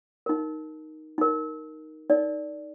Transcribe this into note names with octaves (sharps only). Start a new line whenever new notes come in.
D#4 A#4
D#4 A#4
D#4 A#4 D5